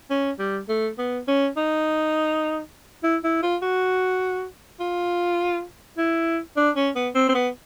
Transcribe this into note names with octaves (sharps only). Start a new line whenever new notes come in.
C#4
G3
A3
B3
C#4
D#4
E4
E4
F4
F#4
F4
E4
D4
C#4
B3
C4
C4
B3